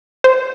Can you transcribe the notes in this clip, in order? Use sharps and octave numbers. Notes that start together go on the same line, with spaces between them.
C5